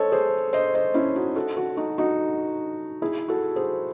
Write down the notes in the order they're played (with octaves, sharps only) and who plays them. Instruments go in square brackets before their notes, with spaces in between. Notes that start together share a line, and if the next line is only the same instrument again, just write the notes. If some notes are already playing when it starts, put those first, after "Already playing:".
Already playing: [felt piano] A4 C5 C#5 D#5
G#4 C5
C5 D#5
C5 D#5
C#4 E4
D#4 F#4
F#4 A4
F#4 A4
D#4 F#4
D#4 F#4
E4 G#4
F#4 A4
G#4 C5